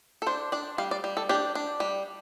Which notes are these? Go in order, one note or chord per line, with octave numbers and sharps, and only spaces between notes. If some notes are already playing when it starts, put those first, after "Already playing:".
A4
D4 C5
D4 D5
G3 F5
D5
G3
A4
D4 G4
D4
G3